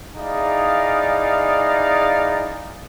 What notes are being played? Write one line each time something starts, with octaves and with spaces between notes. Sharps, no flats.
D#4 E4 G#4 D5 F5